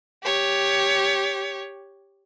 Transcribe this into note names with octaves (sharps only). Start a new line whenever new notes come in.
G4 C#5